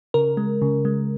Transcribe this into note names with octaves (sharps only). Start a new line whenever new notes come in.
C#3 A#4
G#3
C#3
G#3